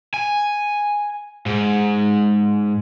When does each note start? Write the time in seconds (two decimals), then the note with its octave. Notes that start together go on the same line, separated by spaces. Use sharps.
0.14 G#5
1.46 G#2